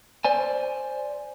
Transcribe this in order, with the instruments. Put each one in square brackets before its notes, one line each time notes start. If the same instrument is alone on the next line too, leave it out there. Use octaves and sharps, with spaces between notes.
[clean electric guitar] C5 D5 G#5